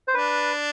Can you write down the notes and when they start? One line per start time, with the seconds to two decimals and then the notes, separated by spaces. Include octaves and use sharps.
0.08 C5
0.14 D4 B4